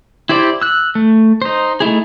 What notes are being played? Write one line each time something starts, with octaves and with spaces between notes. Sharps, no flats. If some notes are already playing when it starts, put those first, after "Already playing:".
E4 G4 C5 D5
E6 F#6
A3
D#4 C5
A3 D#4 E4 G#4